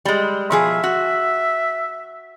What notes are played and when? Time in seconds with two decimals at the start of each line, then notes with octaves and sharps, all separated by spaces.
0.05 G3 G#3
0.51 B2 F3 G#4 E5
0.84 F#4